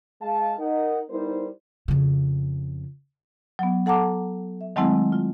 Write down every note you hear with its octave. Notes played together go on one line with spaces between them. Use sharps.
G#3 F5 A5
D#4 A#4 D#5 F#5
G3 B3 D#4 E4 A#4 C5
F2 C#3
F#3 B3
A4 F#5 A5 A#5 D6
E5
D#3 F#3 G#3 A3 C4 E4
F4